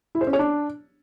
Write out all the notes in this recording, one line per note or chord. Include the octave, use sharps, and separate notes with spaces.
E4
C5
C#4
C#5
D4